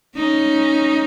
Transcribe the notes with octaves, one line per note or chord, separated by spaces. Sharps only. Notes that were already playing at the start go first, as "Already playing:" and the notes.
C#4 D#4